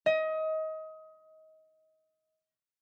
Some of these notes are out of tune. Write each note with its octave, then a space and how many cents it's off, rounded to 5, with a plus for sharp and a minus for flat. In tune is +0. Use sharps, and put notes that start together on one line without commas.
D#5 +25